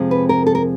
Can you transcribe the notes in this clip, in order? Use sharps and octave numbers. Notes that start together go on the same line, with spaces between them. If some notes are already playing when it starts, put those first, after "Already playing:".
Already playing: F2 C3 F3 G#3 C4
B4
A#4
A4
A#4